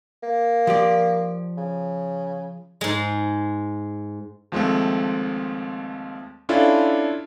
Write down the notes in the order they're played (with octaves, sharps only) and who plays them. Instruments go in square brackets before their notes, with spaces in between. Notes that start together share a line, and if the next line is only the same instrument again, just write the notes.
[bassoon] A#3
[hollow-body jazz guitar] F3 G4 D5
[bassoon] C#3
[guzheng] G#2 G#3
[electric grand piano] D#2 F3 G#3 A3 C4
C#4 D4 E4 F4 A4